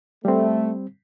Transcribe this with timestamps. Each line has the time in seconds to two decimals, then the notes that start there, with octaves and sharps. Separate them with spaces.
0.25 G3 A3 C4